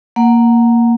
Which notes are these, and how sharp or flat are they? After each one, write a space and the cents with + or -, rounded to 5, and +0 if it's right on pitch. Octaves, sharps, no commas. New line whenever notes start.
A#3 +0 F#5 +0